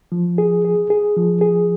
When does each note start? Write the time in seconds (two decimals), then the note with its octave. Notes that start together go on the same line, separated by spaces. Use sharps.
0.12 F3
0.38 G#4
0.65 G#4
0.90 G#4
1.16 F3
1.41 G#4